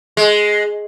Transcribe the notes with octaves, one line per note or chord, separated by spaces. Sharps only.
G#3